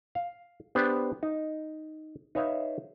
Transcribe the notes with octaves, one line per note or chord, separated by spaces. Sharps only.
F5
B3 D4 G4 C5
D#4
D#4 B4 C#5 E5 F5